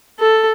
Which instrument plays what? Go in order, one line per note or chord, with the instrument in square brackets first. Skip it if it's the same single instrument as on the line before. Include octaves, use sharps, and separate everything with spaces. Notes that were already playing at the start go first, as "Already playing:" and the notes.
[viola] A4